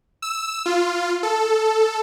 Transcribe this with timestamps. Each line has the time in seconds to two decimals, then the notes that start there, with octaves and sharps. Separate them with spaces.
0.22 E6
0.66 F4
1.23 A4